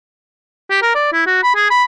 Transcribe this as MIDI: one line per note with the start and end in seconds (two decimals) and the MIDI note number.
0.71 0.78 67
0.82 0.93 70
0.95 1.12 74
1.13 1.23 64
1.27 1.40 66
1.44 1.56 83
1.56 1.66 68
1.71 1.84 83